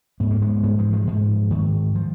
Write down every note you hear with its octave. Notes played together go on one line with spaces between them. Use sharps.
G#2 B3
A#3
G#3 B3
G#2 G#3 B3
F3 G#3
F3 G#3
G#2 F3
G#2 D#3
F3